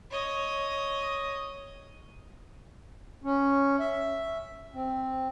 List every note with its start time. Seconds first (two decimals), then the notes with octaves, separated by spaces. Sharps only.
0.11 C#5 D#5
3.24 C#4
3.80 E5
4.74 C4